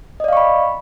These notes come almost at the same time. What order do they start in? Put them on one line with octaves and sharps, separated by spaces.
D#5 D5 F5 C#6 B5